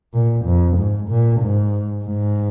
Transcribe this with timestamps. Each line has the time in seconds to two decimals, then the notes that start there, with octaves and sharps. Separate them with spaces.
0.14 A#2
0.46 F2
0.78 G#2
1.10 A#2
1.41 G#2
2.04 G#2